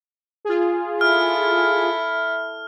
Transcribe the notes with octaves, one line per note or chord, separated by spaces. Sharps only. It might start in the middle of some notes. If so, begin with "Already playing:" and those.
F4 G#4
E4 A4 F6